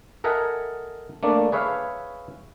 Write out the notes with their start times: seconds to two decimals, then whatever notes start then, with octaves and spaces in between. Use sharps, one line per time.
0.24 A4 A#4 D#5 E5 F#5 G#5
1.23 A3 A#3 D4 D5
1.52 G#4 B4 C#5 E5 F5